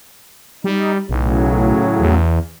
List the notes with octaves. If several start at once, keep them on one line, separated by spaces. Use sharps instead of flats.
G3 D#4
B1 A2 C#3 F#3
E2